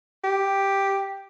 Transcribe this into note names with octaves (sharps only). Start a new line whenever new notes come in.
G4